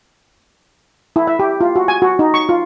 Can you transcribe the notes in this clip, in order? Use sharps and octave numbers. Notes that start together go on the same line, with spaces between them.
E4
E5
G4
F4
F#4
G#5
F#4
D#4
C#6
F4